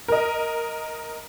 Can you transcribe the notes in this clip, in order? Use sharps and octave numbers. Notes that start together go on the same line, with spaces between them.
A#4 D#5